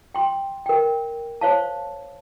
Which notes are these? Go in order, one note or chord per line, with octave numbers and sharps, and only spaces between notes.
G5 C6
A#4 G5
C5 C#5 F5 A5